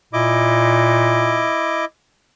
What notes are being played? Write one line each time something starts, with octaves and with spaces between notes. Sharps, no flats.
A#2 E4 D#5 D6